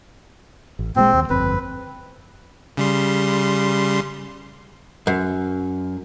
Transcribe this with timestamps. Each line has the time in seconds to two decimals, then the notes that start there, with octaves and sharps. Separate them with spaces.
0.79 A1
0.96 A#2 G3 G#3 C4
1.14 D#2
1.30 G1 F2 C4 B4
2.77 C#3 G3 C6
5.07 F#2